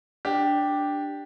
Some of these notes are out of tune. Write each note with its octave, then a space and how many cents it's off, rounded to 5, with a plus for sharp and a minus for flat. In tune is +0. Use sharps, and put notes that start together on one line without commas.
D4 +0 G4 +0